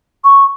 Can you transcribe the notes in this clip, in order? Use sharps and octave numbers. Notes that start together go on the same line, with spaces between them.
C#6